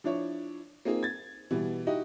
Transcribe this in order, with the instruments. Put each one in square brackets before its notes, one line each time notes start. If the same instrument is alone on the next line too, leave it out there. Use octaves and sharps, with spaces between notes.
[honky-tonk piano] F3 D4 E4 C#5
A#3 C4 D#4 F4 G#4
G#6 A6
B2 E3 G3
D#4 E4 F#4 G4 D#5